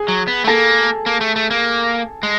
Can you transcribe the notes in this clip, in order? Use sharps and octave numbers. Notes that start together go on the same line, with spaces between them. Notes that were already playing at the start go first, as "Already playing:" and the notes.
Already playing: G#4 G#5
F#3
B3
A3
A#3 A4 A5
A#3
A3
A3
A#3
G#3